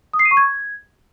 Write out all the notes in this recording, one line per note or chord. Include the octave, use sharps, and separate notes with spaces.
D#6
C7
D#7
C#6
G#6